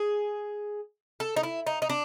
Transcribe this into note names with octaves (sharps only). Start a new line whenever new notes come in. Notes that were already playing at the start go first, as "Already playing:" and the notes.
Already playing: G#4
A4
D#4
E4
D#4
D#4
D4